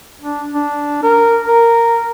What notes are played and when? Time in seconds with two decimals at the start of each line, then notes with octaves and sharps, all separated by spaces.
0.22 D4
0.54 D4
1.03 A#4
1.48 A#4